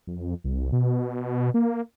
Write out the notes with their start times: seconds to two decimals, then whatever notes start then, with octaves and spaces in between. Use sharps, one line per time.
0.07 F2
0.44 C2
0.72 B2
1.54 A#3